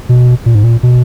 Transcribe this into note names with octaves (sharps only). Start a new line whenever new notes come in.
B2
A#2
G#2
A#2
B2